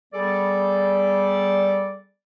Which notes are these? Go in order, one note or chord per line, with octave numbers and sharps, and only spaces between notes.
G3 B3 G#4 A4 D5